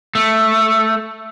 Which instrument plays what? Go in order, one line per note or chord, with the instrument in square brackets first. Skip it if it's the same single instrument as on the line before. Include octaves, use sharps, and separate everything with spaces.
[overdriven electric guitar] A3